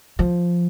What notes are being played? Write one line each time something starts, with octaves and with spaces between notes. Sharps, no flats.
F3